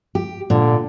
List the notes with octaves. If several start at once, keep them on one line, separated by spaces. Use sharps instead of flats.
G4
A#2 D3